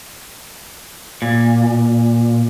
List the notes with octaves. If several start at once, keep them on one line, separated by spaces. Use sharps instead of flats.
A#2